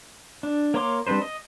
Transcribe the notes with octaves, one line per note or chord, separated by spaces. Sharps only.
D4
A#3 C#5 A#5 C6 D6
G3 C4 D4 B4 C5
D#5